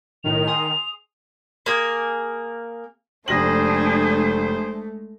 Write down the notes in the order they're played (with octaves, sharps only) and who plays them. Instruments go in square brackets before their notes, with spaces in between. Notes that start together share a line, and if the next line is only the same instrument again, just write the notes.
[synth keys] B1 A2 [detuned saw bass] D#3 [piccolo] F7
[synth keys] G#4 C6 D#6
[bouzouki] A#3 G#4
[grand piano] F1 A#6 F#7 [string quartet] G#3 A3 [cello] D4 G#4 [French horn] C5